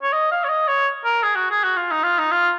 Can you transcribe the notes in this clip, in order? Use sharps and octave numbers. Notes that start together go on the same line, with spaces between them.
C#5
D#5
F5
C#5
D#5
C#5
A#4
G#4
F#4
G#4
F#4
F4
D#4
F4
D#4
F4